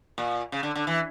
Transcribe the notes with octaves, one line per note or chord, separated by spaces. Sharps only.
A#2
C#3
D3
D3
E3